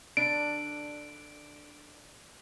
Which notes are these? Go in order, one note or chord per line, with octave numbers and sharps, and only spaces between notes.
D3 D4 D7